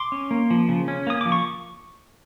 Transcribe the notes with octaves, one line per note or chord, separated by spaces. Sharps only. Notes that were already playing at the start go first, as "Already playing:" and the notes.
Already playing: C6 D6
C#4
A#3
F3
C#3
C#4
A#3 D#6
F3 D6
C#6